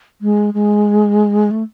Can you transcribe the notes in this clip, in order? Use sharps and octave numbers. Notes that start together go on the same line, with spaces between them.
G#3
G#3
A3